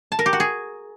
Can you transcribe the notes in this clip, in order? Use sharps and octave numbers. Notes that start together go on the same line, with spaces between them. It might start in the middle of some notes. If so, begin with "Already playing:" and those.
A5
A#4
G4
F#4
G#4